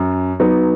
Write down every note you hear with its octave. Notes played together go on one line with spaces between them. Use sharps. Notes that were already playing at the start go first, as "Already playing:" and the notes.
Already playing: F#2
F#3 B3 D#4